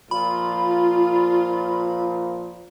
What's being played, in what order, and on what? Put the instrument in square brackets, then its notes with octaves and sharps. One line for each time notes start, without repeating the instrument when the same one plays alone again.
[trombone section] A#2 F3 [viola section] F4 [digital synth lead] B5